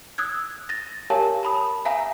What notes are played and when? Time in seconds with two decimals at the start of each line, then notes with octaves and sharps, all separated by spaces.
0.18 D#6 E6 F#6 G#6
0.69 A6 A#6
1.10 G4 A#4 C#5 F5 G#5 A5
1.43 A5 B5 D#6
1.85 E5 F5 G#5 A#5